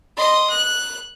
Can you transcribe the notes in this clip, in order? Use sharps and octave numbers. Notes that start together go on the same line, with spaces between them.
D#5 C6
F#6